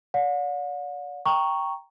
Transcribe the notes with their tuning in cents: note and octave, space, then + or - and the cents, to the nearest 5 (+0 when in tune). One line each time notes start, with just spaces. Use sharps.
D5 -40 F#5 -45
G5 +0 A#5 +0 C#6 +0